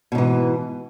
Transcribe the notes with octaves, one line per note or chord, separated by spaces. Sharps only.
G#2 B2 E3